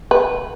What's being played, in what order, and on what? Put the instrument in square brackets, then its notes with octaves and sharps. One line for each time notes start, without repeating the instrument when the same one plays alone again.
[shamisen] B4